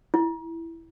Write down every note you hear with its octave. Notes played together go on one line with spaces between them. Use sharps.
E4